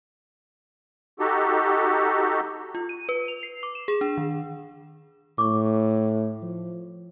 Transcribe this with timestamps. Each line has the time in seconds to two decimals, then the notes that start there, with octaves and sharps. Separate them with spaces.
1.19 D#4 F#4 G4 A4
2.75 F4
2.89 D#7
3.09 B4
3.28 F7
3.43 C7
3.63 D6
3.75 E7
3.88 G#4
4.01 D4
4.18 D#3
5.38 A2 C#6 D6
6.42 F3